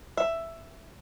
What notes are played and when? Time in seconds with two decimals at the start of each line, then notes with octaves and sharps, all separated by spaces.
0.17 E5